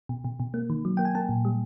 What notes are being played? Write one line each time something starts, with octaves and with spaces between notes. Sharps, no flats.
B2
B2
B2
A#3
D#3
F#3
A#3 G5
G#5
A#3 A5
A#2
G3